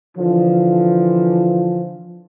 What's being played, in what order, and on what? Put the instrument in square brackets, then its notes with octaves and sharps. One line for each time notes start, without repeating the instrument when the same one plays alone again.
[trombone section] D3 E3 F3